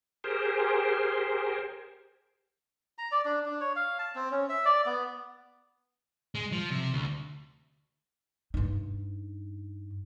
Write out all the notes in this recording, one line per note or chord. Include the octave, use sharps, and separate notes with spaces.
G4 G#4 A#4 C5
A#5
D5
D4
D4
C#5
F5
A5
C4
C#4
E5
D5
B3
G#3
F3
C3
D2
G2 D#4